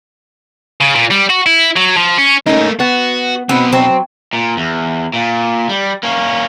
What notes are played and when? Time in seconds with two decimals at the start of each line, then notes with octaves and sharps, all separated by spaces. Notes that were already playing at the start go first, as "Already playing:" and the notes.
0.80 C#3
0.95 A#2
1.11 G3
1.30 F#4
1.46 E4
1.76 F#3
1.97 F3
2.18 C#4
2.46 A3 A#3 C#4 D#4
2.80 B3 F#4
3.49 B1 B2 B3 C4
3.73 F#3 C4
4.33 A#2
4.57 E2
5.13 A#2
5.69 G3
6.03 A#3 C#4